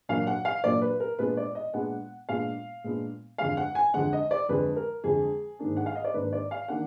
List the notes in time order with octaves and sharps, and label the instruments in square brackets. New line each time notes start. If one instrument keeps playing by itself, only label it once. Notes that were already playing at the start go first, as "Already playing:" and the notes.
[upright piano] A#2 F#3 A#3 D4 F5
F#5
F5
A#2 F#3 A#3 D4 D5
B4
A#4
A#2 G#3 B3 D4 B4
D5
D#5
A#2 G#3 B3 D4 F#5
A#2 G#3 B3 D4 F5
A#2 G#3 B3 D4
F2 D3 G#3 F5
F#5
G#5
F2 D3 G#3 F#5
D#5
D5
F2 D3 G#3 B4
A#4
F2 D3 G#3 G#4
G#2 D#3 A#3 D4
F#5
F5
D#5
D5
G#2 D#3 A#3 D4 B4
D5
F5
D#3 A#3 D4 F#5